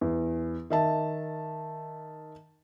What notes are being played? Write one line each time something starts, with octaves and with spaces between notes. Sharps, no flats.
E2
D#3 E5 A5